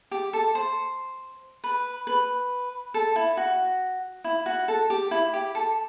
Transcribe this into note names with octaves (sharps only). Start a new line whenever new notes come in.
G4
A4
C5
B4
B4
A4
E4
F#4
E4
F#4
A4
G4
E4
G4
A4